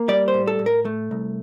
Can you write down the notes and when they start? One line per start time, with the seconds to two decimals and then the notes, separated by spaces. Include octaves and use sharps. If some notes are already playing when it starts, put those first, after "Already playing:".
Already playing: A#3
0.08 G3 D5
0.28 C5
0.34 A2
0.47 A4
0.59 A2
0.66 A#4
0.85 A3
1.11 C2